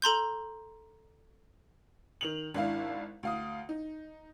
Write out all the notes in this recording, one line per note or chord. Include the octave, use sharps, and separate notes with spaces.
A4 A#5 C6 G6
D#3 F7 F#7
G#1 D4 E4 F5
D2 F5 D#6
D#4